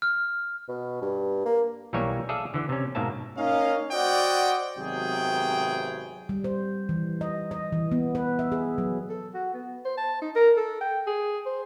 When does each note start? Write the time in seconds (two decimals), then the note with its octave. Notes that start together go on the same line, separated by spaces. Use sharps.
0.02 F6
0.69 B2
1.02 G2
1.46 A#3
1.93 B1 E3 G3 A#3 C#5 G#5
2.29 G#4 A4 D5 E5 F5
2.54 D3 E3
2.69 C3 C#4
2.95 G#2 B2 A#3 E5 A5
3.37 A#3 C#4 D#4 D#5 F5
3.92 F#4 C5 D5 D#5 F#5 G5
4.77 G#1 C3 F#3 B3 G#4 G5
6.29 G3
6.44 C5
6.89 E3
7.21 D#5
7.51 D#5
7.72 E3
7.92 B3
8.15 B4
8.39 E5
8.52 G#4
8.78 F#3
9.09 A4
9.34 F#4
9.54 B3
9.85 C5
9.97 A5
10.22 D#4
10.35 A#4
10.57 A4
10.81 G5
11.06 G#4
11.46 C5